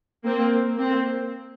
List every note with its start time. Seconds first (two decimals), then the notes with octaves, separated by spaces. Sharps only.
0.25 A#3 C4
0.77 A#3 C4